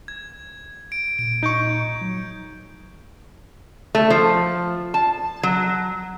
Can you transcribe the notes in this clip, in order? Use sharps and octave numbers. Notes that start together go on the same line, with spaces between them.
G#6
D7
A#2 D7
D#4 C#6 G6 D7
F#3
A3
F3
A5
F#3